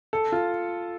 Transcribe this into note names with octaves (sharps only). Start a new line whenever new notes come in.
A4
F4